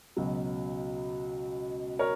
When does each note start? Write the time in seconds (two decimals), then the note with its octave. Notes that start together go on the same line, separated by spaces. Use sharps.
0.17 C#2 B2 F#3
1.99 A#4 C#5